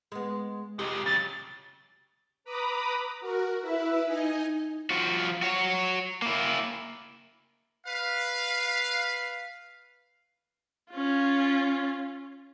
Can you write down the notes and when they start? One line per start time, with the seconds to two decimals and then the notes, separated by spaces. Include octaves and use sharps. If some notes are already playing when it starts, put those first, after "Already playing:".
0.12 G#3 B3
0.79 F2 C3 G#3 G4 D#5
1.06 C#3 F#3 A6
2.44 B4 A#5 B5 D6 D#6
3.21 F#4 A#4
3.61 E4 B4 E5
4.06 D#4 D#5 G#5
4.90 F3 F#4
5.42 F#4 C#5
6.22 A#3 E4
7.86 B4 F5
10.91 C#4 F4